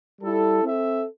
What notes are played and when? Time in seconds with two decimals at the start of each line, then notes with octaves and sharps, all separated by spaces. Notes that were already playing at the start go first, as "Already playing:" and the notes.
0.22 G3 E4 A4
0.63 C4 A4 E5